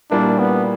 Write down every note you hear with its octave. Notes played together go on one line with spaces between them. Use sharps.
A#2 G3 A#3 D4 E4
B3